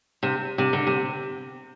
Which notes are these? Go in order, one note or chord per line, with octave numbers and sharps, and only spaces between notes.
C3
C3
D3
C3